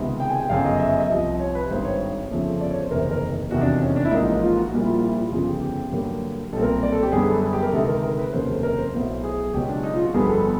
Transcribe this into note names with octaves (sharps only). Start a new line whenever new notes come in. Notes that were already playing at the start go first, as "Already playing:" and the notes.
Already playing: C#2 C3 D#3 G#3 B3
G5
G#5
G5
G1 F#2 C#3 F5
D#5
E5
D#5
E5
C2 C3 F3 D#5
C#5
B4
G#1 G2 D#3 C5
C#5
G1 F2 C#3 F3 A3
D5
C#5
C5
F#1 E2 C3 D#3 A#4
C5
A#4
F1 E2 C3 D#3 F#4
D4
C#4
D4
E4
A1 G#2 F3 A#3 D#4
F4
F#4
A#1 A#2 G3 A#3
E4
F4
E4
F4
G1 F2 C#3 F4
G4
G4
G2 D3 F#3 A#3
B1 A#2 G3 C4 A4
A#4
D5
A4
G4
F#2 D3 G3 B3 G#4
A4
G#4
G4
A#4
D2 C3 D#3 G#3 A4
A#4
A#4
B4
F1 D#2 C#3 F#3 A#3 C5
A4
A#4
C5
B1 A2 F#3 B3
G#4
C#2 B2 F#3 G4
D4
D#4
F4
F#4
G1 F2 D3 G3 B3 G#4
A4